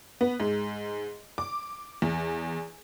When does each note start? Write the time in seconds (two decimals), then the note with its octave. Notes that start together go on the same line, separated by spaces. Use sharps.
0.21 B3
0.40 G#2
1.38 D6
2.02 E2